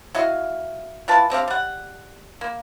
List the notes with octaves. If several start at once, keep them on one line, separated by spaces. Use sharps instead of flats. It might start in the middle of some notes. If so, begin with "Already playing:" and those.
E4 F#4 D#5 F5
E3 F4 B4 A5
D3 C4 G4 F5
G3 F#5
A#3